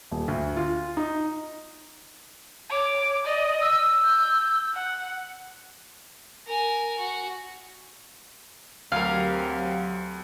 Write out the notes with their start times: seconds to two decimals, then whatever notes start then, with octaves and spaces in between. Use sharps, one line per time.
0.11 D#1
0.28 D2
0.57 F4
0.97 D#4
2.70 C#5 D6
3.25 D5 D#5
3.60 E6
4.05 G6
4.74 F#5
6.47 A#4 G#5
6.98 F#4
8.92 D2 F#3 C4 G4 A#4 F5